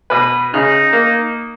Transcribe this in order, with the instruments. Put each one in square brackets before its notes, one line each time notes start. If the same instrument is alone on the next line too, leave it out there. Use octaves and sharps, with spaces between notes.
[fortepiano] B2 B4
[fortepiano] C#3 [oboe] D#4
[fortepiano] A#3